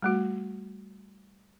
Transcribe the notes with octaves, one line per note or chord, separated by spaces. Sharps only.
G3 A3 F#4